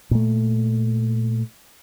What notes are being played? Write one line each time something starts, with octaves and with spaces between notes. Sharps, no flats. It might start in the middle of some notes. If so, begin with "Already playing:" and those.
A#2 A3